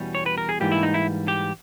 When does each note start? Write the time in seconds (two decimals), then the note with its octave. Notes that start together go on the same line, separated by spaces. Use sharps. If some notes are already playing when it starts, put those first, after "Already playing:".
Already playing: E2 B2 G3 C#4
0.15 C#5
0.26 B4
0.38 A#4
0.49 G#4
0.60 G#2 E3 G3 A#3 G4
0.72 E4
0.83 D#4
0.94 E4
1.28 G4